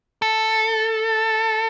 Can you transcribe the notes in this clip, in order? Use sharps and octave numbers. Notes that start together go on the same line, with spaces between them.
A4